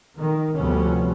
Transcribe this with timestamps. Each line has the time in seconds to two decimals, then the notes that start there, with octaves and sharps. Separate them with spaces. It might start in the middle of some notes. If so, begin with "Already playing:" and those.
0.16 D#3
0.57 D2 C3 F3 G3 B3 C#4